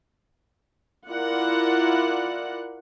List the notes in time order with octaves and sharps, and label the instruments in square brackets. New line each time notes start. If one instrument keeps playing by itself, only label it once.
[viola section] E4 F4 A#4 D5 F#5